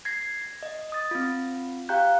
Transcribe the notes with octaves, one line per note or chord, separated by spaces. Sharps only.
G#6 A#6 C7
D#5
D#6 A6
C4 F4
G4 F5 G5 A#5 F#6 G6